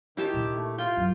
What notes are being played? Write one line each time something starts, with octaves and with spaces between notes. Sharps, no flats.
D#3 E4 G4 A5
A#2 D3
A3
F4 G5
F#2